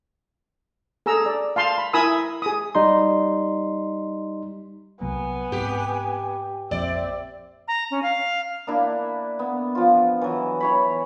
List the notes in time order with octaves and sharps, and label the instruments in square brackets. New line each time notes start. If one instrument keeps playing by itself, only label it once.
[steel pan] G#4 A4 A#5 E6
D5
F5 A5 C6
B5
E4 A#4 G#5 B5 D#6 E6
G#4 D#6
[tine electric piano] G3 D#4 C6
[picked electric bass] C2 F#3 A#3 [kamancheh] B3 G#5
[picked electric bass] G#2 C4 [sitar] G4
[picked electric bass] A#1 F2 A#2 [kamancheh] C4 E5 [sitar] D5
[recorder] A#5
C#4
F5
[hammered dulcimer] A#3 D4 E4
B3
F3 F4
E3 F#3
E3 C#5 B5